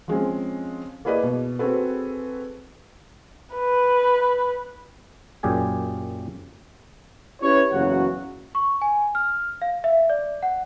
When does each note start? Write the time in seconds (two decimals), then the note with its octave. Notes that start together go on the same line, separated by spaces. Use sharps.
0.08 F3 G#3 C4 C#4
1.05 A#3 E4 G#4 B4 D5 D#5
1.23 B2
1.59 C4 F#4 G#4 A4 B4
3.54 B4
5.43 F#2 A#2 G4 G#4 G#5
7.42 C#4 E4 G4 B4 C#5
7.72 F#1 E2 C#3 F#3 F#4 F#5
8.55 C#6
8.81 G#5
9.15 F6
9.62 F5
9.84 E5
10.10 D5
10.43 F#5